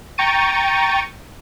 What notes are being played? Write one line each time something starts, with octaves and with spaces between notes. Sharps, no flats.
G5 A#5 C#6 A6 C#7 D#7